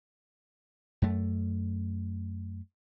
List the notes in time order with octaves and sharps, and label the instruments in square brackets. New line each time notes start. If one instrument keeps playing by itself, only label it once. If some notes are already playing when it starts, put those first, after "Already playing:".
[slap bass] F#2 A3